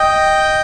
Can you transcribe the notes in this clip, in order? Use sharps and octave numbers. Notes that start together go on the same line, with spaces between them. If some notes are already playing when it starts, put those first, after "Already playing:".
Already playing: D#5 G5